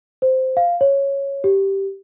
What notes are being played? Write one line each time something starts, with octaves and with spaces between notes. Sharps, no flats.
C5
F5
C#5
G4